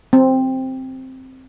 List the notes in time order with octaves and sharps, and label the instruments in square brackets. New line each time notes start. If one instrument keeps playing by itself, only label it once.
[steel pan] C4